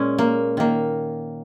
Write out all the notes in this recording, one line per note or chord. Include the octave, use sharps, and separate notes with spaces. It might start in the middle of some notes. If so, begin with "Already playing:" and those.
Already playing: A#2 G#3 C#4
A#3
D#3 A#3